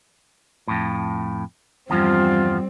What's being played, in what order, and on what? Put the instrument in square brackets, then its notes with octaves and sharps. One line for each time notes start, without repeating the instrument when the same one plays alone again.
[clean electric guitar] F2 A2
[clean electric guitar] E2 G2 F3 [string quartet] G3 C4 [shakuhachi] F4